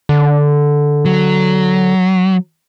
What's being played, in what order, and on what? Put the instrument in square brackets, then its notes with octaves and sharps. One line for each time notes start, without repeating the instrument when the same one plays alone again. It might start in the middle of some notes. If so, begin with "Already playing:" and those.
[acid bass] D3
[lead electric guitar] F#3